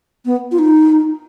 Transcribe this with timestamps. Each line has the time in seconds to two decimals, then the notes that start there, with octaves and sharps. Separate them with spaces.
0.26 B3
0.52 F4
0.59 D#4